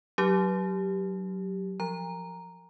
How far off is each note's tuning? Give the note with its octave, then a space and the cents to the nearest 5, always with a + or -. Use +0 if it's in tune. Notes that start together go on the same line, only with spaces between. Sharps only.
F#3 +10 D4 +30 G4 +0
F3 +0 A#5 +0